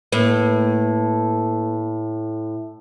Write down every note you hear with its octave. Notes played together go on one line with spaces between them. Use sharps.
A2 A#3 B4